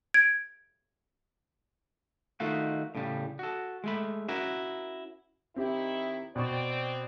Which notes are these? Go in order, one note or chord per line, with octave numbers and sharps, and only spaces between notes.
G#6 D7
D#3 A3 D#4 F4 F#4
A2 C#3 G3
F#4 A4
G#3 A3 B5
C#4 E4 F#4 A#4
D#3 C4 E4 G4
B2 C4 D5 G5 C#6